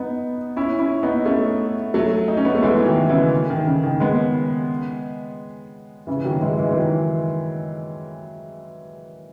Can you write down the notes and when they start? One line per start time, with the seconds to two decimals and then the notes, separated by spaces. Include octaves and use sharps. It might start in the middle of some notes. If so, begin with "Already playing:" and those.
Already playing: B3 D#4
0.57 C#4 E4
0.79 C#4 E4
1.03 B3 D#4
1.26 A3 C#4
1.94 F#3 A3
2.28 D#4
2.37 C#4
2.45 B3
2.55 A3
2.62 E3 G#3
2.86 D#3 F#3
3.09 C#3 E3
3.50 D#3
3.66 C#3
3.84 D#3
4.00 G#3 B3
6.07 C#3 E3
6.24 D#3 F#3
6.42 E3 G#3
6.59 E3 G#3
6.71 E3
6.76 D#3 F#3